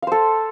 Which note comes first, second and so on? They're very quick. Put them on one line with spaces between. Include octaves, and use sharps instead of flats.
F5 C5 A4